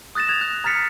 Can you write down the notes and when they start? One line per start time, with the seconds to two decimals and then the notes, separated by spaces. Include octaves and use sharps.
0.15 D#6 F#6 A6 A#6 E7
0.29 G#6 F7
0.41 F#6
0.64 A#5 F6 A6 B6 C#7